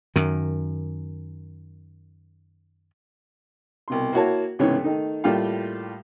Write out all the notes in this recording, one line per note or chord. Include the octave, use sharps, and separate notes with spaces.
F#2 D#3
C2 B2 C6
A#3 E4 F#4 C#5 A5
C2 G#2 C#3 E3 B3 C#5
D#3 A3 D#4
A2 G3 A#3 F4 G4 F5